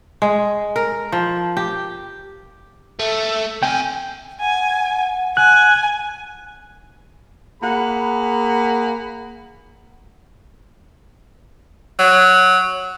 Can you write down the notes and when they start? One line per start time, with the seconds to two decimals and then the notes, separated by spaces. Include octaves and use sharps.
0.22 G#3
0.76 A#4
1.12 F3
1.57 G4
2.99 A3
3.63 C3 G5 G#5
4.41 F#5 G#5
5.37 G#5 F#6
7.62 A#3 G#4 F#5 B5
11.99 F#3